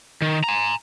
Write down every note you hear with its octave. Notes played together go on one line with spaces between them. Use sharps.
D#3
G#5 A#5